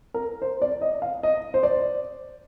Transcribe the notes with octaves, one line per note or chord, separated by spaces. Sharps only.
A#4
C5
D5
D#5
F5
D#5
C5
D5